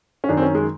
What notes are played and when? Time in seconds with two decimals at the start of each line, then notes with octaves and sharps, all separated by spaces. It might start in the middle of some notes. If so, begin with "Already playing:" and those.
0.24 C#4
0.29 F#2 D#3 D4
0.37 C4
0.42 C#4
0.55 G#3